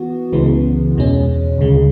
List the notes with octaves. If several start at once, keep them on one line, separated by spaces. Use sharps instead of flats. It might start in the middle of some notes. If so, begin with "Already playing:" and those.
Already playing: E3 B3 F#4
C#2 C#3 E3 G#3 B3
E2 B2 G#3 C#4
D2 C#3 G#3